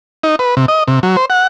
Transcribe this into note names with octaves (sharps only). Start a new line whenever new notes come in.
D#4
B4
C3
D#5
C3
F#3
C5
F#5